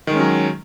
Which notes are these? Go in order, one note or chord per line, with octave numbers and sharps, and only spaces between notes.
D#3 F#3 G#3 C#4